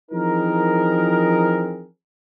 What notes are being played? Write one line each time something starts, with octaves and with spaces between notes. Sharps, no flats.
E3 F3 C4 D#4 G#4 A#4